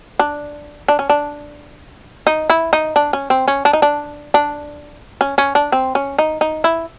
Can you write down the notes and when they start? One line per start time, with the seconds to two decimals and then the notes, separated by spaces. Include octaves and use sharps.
0.19 D4
0.88 D4
0.99 C#4
1.10 D4
2.27 D#4
2.50 E4
2.73 D#4
2.96 D4
3.13 C#4
3.30 C4
3.48 C#4
3.65 D4
3.73 D#4
3.82 D4
4.34 D4
5.21 C#4
5.38 C#4
5.55 D4
5.72 C4
5.95 C#4
6.19 D#4
6.41 D#4
6.64 E4